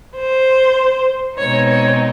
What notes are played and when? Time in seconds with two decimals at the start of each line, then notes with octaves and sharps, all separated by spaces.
0.16 C5
1.37 B2 G#3 C4 D#4 C#5
1.68 C#5